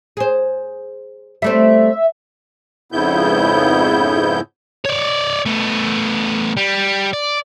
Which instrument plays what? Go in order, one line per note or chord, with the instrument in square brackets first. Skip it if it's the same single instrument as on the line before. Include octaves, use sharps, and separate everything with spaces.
[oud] G#4 C5
[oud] G3 A3 C4 [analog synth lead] E5
[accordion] F2 G#2 C#3 B3 E4 G6
[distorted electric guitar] C#5 D5
A3 B3
G3
D5